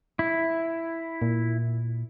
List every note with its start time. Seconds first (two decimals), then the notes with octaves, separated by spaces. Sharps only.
0.19 E4
1.22 A#2